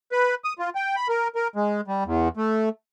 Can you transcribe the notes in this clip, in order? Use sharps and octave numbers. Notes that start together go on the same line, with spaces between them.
B4
D#6
F4
G5
B5
A#4
A#4
G#3
G3
E2
A3